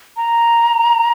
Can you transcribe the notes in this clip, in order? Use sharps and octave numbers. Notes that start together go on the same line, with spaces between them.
A#5